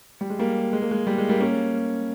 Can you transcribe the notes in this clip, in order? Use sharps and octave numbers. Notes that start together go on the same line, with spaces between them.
G3
G#3
G3 A#3
G#3
A#3
G#3
G3
G#3
G3 A#3
A#3 C#4